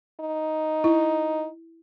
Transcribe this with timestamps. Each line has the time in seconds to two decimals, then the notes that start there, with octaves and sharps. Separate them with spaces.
0.20 D#4
0.84 E4